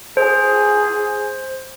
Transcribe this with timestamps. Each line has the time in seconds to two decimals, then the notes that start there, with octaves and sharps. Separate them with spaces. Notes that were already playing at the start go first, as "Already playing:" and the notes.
0.17 G#4 C5